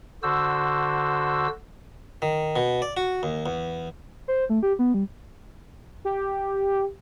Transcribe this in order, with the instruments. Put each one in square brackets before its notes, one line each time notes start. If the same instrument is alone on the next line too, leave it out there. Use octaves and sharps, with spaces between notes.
[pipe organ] D3 F#4 C5 E6
[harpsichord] D#3
B2
D5
F#4
D#2
E2
[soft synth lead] C5
A3
G4
B3
G3
[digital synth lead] G4